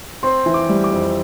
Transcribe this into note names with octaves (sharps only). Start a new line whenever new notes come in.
C4 C6
E3
D6
G3
D6
F2